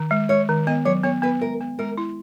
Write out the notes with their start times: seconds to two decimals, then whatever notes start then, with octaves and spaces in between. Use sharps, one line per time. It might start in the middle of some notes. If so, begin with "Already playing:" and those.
Already playing: D#3
0.11 G#3
0.29 G#3 C#5
0.49 D#3
0.67 B3 D#5
0.85 F#3 C#5
1.04 B3 C#5
1.22 B3 B4
1.41 G#3 A#4
1.61 B3
1.79 G#3 A#4
1.98 E4